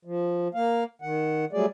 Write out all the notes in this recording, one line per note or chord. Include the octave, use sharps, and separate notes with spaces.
F3
A#3 F5
D#3 F#5
F#3 G3 A3 G#4 D5